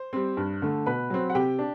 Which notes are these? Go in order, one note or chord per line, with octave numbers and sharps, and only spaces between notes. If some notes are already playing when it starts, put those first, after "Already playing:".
Already playing: C5
G3 C4
G2
D3 A3
B2 B4 B5
F#3 C4
F#5
C3 G4 G5
D4